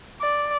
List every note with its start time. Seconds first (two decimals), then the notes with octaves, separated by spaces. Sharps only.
0.21 D5